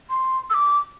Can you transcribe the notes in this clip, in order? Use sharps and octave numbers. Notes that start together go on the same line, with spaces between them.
C6
E6
D6